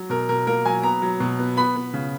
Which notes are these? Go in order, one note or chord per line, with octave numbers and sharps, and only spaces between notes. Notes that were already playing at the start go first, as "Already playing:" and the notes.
Already playing: F#3
B2 A#4
B2 A#4
A#3 A#4
F#3 G#5
B3 A#5
F#3
B2
B3
B3 B5
B3
C#3